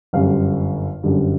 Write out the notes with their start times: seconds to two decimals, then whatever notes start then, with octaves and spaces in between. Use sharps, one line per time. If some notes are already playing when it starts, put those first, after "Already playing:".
0.13 G1 F#2 D3 G3 F5
1.03 G1 F#2 D3 G3